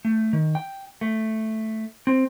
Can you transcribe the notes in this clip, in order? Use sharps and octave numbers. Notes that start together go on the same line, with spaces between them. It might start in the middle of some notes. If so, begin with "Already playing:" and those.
A3
D#3
G5
A3
C4